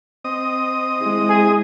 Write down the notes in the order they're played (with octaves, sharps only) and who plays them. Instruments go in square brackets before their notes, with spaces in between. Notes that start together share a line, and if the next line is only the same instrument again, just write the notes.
[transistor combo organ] C4 D#5 D#6
[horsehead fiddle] G#3 E4
[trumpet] G#4